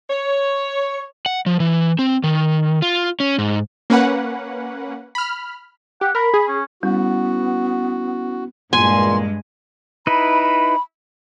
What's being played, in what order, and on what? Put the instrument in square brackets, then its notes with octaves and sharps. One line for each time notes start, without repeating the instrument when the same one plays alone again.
[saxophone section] C#5
[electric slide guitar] F#5
F3
E3
C4
D#3
F4
C#4
G#2
[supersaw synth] A#3 C#4 B4 F#5
B5 F6
[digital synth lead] G4 [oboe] F#5
[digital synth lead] A#4 [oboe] B5
[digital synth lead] G#4
[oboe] C#4
[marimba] G3 [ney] B3 [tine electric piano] C#4 E4 [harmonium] F#4
[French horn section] E2 A#2 [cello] G2 G#3 [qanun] G#5 [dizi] C6
[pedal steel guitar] D#4 E4 B4 [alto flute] B5